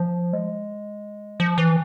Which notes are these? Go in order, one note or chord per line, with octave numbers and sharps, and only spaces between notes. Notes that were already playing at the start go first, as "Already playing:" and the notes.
Already playing: F3
G#3
F3
E3